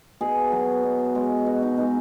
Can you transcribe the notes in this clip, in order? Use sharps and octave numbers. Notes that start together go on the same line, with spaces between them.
B2 G#4
F#3 B3
B2
G#3 B3
B2 F#4
D#4
G#3 B3 D#4